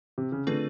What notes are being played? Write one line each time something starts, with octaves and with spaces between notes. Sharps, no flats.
C3
C#3
D3 A3 C4 F4 G#4 B4